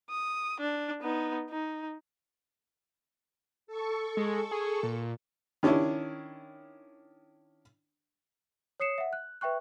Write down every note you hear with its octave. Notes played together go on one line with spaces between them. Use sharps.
D#6
D4
B3 D#4
D#4
A4 C#6
G#3
G#4
A#2
D#3 C#4 D4 E4
C#5 D#6 C7 C#7 E7
E5 F#5
F#6
B4 E5 G5 C#6 F#6